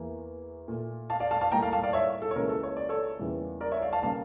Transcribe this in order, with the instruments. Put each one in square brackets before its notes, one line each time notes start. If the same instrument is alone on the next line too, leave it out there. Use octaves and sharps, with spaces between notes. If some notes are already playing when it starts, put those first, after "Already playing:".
Already playing: [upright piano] E2 E3 A#3
A#2 A3
F5 A5
D5 F5
F5 A5
F5 A5
A2 G3 A#3 G5 A#5
F5 A5
F5 A5
D5 F5
C#5 E5
A4
C#5
C#2 C#3 E3 A#3 A#4
A4
C#5
D5
A4 C#5
E2 C#3 E3 G3 A#3
A#4 D5
C#5 E5
D5 F5
F5 A5
C#3 G3 A#3 F5 A5